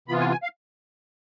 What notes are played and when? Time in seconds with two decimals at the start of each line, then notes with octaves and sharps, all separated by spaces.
0.08 C3 E3 B3 F4 B5
0.20 G#5
0.31 G#5
0.43 F5